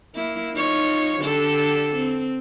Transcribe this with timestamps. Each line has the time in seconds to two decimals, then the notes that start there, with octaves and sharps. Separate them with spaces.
0.15 A#3 E4
0.55 D#4 F4 C#5
1.21 D3 G4 A4
1.95 C4